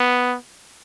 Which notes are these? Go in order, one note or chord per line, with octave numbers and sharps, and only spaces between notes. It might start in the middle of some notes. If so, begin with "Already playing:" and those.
Already playing: B3